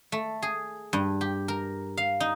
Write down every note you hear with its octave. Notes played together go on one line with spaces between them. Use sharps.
A3
G#4
G2
G4
A#4
F5
D#4